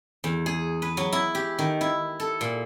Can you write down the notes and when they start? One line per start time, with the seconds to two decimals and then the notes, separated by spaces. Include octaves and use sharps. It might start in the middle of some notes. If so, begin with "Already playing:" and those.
0.24 E2
0.46 G#4
0.82 B4
0.97 F#3
1.12 E4
1.35 G4
1.59 D#3
1.81 E4
2.20 A4
2.41 A#2